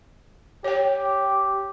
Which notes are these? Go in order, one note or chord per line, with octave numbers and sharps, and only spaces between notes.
G4 C#5 G5